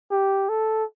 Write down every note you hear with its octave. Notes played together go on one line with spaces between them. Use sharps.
G4
A4